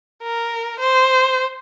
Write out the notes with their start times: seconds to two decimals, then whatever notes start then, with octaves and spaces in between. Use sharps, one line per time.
0.23 A#4
0.80 C5